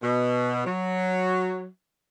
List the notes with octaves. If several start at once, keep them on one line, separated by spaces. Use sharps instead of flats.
B2
F#3